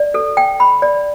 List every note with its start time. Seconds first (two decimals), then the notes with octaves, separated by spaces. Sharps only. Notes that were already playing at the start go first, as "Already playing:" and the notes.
Already playing: D5
0.14 A4
0.37 G5
0.60 B5
0.82 D5